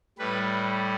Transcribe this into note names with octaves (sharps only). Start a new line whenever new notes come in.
A2 G3 B4